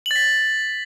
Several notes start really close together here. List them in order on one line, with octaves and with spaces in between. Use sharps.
F#7 A6 B6